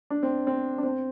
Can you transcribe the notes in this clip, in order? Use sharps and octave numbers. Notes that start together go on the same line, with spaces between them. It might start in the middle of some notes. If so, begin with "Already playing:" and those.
D4
C4
C4
D4
C4